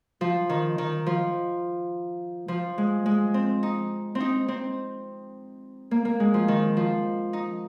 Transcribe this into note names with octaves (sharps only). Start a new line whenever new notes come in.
F3
D#3
D#3
F3
F3
G#3
G#3
C4
D#4
C4
D#4
C4
A#3
A#3
G#3
F3
D#3
F3
D#4